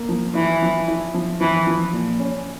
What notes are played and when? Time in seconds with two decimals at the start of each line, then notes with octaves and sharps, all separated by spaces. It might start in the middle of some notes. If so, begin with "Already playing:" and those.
Already playing: A#3
0.09 F3
0.35 E3 E4
0.62 F3
0.88 E4
1.14 F3
1.41 E3 F3
1.67 F3
1.93 A#2
2.19 C#4